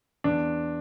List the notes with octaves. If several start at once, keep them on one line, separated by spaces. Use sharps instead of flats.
E2 D4